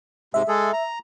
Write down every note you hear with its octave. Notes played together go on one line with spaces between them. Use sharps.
G#2 C3 G#3 E5
G#3 G#4 A4
A#5